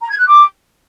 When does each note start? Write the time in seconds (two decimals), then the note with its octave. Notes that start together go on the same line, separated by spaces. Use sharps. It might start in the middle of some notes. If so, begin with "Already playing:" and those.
0.01 A#5
0.09 G#6
0.18 F#6
0.26 D6